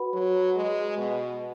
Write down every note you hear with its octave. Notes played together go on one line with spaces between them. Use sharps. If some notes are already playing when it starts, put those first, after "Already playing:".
Already playing: F#4 B4 F#5 B5
F#3
G#3
B2